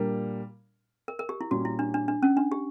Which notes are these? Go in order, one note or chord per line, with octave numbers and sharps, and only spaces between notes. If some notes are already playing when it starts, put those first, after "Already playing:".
Already playing: A#2 G3 A#3 D4 A#4
A#4
A#4
G4
E4
A#2 G3 C#4 F#4
E4
D4
D4
D4
C#4
D4
G4